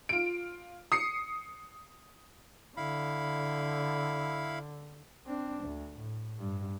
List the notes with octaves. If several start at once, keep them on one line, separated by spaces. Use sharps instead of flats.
F4 D7
D#6 C7 C#7
D3 E4 F5 B5
C4 D4
D2
A2
G2